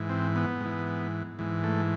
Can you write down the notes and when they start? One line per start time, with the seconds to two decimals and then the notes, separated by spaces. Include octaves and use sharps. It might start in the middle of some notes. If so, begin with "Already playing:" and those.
Already playing: G#2 E3
0.10 C4
0.36 B3
0.61 G#2 E3
1.39 G#2 E3
1.64 A3